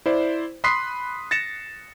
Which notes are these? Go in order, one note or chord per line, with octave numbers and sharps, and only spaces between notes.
E4 C5 D5
B5 C6 D#6 F#6 B6 C7
A6 A#6 C#7 E7